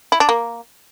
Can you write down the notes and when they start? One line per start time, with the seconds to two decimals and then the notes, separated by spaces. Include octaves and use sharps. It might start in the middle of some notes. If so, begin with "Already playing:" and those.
0.12 E4
0.20 D4
0.29 A#3